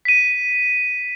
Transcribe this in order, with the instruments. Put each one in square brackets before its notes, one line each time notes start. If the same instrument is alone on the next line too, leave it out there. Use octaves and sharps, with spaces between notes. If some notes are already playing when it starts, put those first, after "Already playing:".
[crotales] B6 D#7